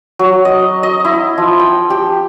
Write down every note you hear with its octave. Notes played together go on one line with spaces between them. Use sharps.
F#3
D#5
D#5
E4
F3
G5
G4